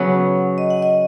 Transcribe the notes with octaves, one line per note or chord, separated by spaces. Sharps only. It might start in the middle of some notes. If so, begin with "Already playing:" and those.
Already playing: C#3 F#3 B3 F#5
D#5
F#5
D#5